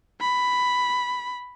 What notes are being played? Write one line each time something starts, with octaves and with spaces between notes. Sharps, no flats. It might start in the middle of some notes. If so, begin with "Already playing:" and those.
B5